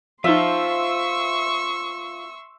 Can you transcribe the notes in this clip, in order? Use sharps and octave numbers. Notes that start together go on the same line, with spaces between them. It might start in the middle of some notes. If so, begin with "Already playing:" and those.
F3 D#4 F4 C5 E5 C6 C#6 E6